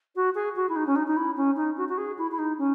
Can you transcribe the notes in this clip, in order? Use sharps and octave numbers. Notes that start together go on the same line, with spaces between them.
F#4
G#4
F#4
E4
D#4
C#4
D#4
D#4
E4
C#4
D#4
F#4
F#4
G#4
E4
E4
D#4
C#4